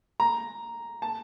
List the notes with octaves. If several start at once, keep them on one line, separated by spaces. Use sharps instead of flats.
A#5
A5